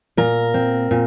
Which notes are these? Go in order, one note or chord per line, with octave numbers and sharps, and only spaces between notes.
A#2 A#4
C4
A#2